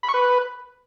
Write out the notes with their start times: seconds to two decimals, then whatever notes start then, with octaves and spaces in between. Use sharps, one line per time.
0.03 B5
0.09 C#6
0.14 B4